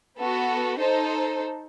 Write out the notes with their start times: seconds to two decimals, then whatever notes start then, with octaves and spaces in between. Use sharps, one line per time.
0.18 B3 F#4 A4
0.79 D#4 A4 C5